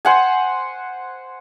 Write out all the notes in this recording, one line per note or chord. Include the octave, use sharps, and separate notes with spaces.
C5 F#5 G#5